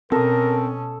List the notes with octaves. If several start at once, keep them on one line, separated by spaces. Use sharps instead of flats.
B2 C4 C#4 A4 A#4 D#6